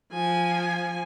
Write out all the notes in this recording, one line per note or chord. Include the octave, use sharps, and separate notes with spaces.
F3 G#5